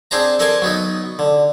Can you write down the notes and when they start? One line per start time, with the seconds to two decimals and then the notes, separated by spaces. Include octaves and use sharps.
0.11 C4 D4 G#4 C5 A5 A#5
0.39 A4 A#4 C5 D5 G#5 A5
0.62 F#3 B3 D#4
1.19 D3